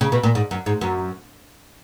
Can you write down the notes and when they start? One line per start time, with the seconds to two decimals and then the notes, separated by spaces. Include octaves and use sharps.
0.01 C#3
0.12 B2
0.23 A#2
0.35 G#2
0.51 F#2
0.66 G#2
0.81 F#2